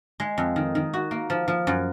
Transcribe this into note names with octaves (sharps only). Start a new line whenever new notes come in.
G#3
F2
D#3
D#3
F#4
A#3
F3
F3
F#2